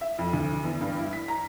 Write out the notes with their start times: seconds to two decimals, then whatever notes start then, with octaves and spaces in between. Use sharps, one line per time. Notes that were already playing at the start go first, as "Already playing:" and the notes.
0.01 E5
0.19 F2
0.33 D2
0.64 E2
0.81 G2
0.98 E4
1.13 B6
1.28 A#5